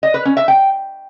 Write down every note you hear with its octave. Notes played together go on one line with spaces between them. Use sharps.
D#5
B4
C#4
E5
G5